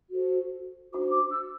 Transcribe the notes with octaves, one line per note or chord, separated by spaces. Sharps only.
F#4 A4 C5
D4 F#4 C5 D6
D6
E6